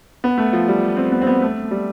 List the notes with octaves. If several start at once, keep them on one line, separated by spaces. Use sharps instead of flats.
B3
A3
F3
G3
C4
B3
C4
B3
A3
G3